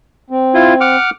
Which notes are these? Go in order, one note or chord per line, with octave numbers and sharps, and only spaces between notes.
C4
E4 F4
F#5 D6 F6